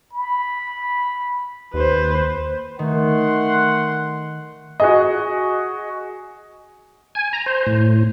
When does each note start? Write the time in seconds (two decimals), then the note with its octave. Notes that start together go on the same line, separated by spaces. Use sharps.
0.13 B5
1.74 D#2 B4 C5
2.79 D#3 A3 F#5 C6
4.80 F#4 G#4 D#5
7.15 G#5
7.33 A#5
7.46 C5
7.66 A2